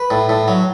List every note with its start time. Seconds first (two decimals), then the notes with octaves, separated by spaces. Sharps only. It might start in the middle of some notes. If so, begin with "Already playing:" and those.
Already playing: B4
0.10 A2
0.29 A2
0.48 F#3